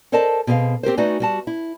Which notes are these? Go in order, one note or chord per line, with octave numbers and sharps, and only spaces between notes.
A4 A#4 C5 D5 D#5 A5
B2 C4 G#4 E5 F5
C4 G4 A#4 C5
A3 D#4 F#4 B4 D5 G#5
G3 F#4 A5
E4